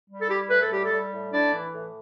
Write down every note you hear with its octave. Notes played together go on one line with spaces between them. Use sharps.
G3
A4
E4 G4
A2 B4
A4
G3 G4
A4
G3
A2
D4 E4 D5
E3
A2